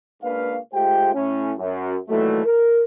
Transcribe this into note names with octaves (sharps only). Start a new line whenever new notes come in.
C#2 A#3 D4 B4 F5
G#3 A3 F4 G4 C5 G5
A2 C#4
F#2
A#2 D#3 E3 F#3 A3
A#4